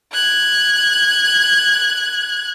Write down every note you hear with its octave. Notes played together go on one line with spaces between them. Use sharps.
F#6 G#6